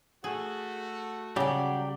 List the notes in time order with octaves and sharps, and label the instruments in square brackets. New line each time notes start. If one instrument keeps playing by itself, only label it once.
[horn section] A3 F#4 [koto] G#4
[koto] C#3 [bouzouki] F#3 D5 [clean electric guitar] G3 G4